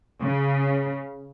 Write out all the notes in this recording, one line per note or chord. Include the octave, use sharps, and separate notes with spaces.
C#3